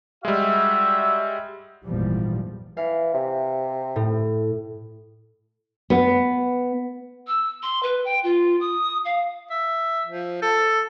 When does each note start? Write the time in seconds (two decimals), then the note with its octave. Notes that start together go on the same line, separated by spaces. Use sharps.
0.25 G3 G#3 F#4 E5
1.84 G#1 E2 A#2 E3 F3 G3
2.77 E3 F5
3.14 C3
3.96 A2
5.90 B3
7.27 E6
7.62 C6
7.82 B4
8.04 G5
8.23 F4
8.60 D#6
9.05 F5
9.50 E5
10.06 F3
10.42 A4